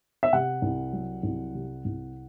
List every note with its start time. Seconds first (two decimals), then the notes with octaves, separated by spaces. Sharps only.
0.23 E5
0.33 C3 F#5
0.62 C2
0.93 F#3
1.23 C2
1.55 C3
1.85 C2